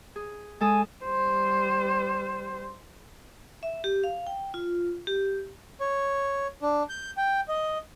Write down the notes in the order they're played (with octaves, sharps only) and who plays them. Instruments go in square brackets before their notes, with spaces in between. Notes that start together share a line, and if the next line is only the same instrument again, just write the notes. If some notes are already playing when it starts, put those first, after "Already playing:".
[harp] G#4
[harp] G#3 A4 D#6 [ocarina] G#5
[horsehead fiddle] G3 C5
[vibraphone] E5
G4
F5
G5
F4
G4
[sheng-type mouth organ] C#5
D4
G6
G5
D#5